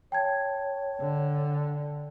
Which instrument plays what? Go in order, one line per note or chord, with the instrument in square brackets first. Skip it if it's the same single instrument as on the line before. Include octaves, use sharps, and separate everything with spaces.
[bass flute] C#5 [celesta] G5 A5 G#6
[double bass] D3